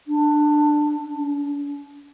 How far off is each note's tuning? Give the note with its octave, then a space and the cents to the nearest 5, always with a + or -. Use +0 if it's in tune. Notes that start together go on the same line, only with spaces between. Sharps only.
D4 +15
D4 -45